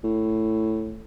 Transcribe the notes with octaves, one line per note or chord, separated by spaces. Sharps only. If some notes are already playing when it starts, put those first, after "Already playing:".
A2